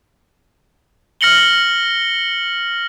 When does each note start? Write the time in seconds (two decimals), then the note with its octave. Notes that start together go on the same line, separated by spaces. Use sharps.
1.21 F6 A#6 C#7 F#7 G7